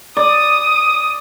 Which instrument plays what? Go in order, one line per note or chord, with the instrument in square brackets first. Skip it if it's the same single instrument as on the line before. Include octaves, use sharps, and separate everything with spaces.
[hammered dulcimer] D5 [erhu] D#6